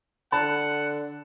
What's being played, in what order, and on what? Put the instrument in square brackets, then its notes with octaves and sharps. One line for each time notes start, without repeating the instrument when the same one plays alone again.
[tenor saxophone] D3 [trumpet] F#5 [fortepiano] A5 [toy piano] B5